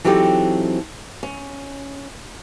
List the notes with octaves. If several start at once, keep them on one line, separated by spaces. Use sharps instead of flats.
E3 F#3 C4 D#4 G4 A4
C#4